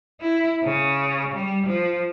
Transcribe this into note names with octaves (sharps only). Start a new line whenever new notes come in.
E4
C#3
G3
F3